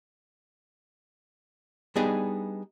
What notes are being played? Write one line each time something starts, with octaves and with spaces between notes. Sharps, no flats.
G3 B3 D4 D#4 G#4 D#5